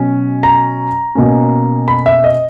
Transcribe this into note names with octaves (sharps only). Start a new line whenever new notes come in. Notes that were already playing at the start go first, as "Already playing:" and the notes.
Already playing: B2 F#3 C#4
A#5
B2 A#3 C#4
B5
E5
D#5